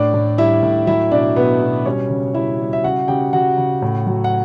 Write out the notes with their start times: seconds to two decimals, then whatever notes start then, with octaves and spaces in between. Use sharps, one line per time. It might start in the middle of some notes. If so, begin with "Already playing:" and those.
Already playing: A2 D4 D5
0.14 A2
0.38 G3 E4 E5
0.63 A2
0.87 F#3 E4 E5
1.11 B2 D4 D5
1.36 B2 B3 B4
1.61 B2
1.85 G3 C#4 C#5
2.10 C#3
2.34 G3 E4 E5
2.60 G3
2.73 E5
2.84 C#3 F#4 F#5
3.08 C#3 G4 G5
3.33 C#3 F#4 F#5
3.58 C#3
3.82 A2
4.07 F#3
4.24 F#5